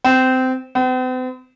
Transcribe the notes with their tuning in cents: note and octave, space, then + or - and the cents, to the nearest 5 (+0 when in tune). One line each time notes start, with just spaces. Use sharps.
C4 -20
C4 -45